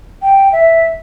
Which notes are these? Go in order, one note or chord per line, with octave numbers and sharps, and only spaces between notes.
G5
E5